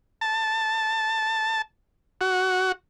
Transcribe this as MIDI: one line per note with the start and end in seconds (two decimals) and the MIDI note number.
0.21 1.62 81
2.21 2.72 66